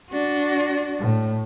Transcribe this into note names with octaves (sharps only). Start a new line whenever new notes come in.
D4 F#4
A2